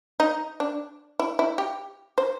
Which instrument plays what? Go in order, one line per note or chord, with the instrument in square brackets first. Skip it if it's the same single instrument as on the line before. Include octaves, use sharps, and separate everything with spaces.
[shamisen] D#4
D4
E4
E4
G4
C5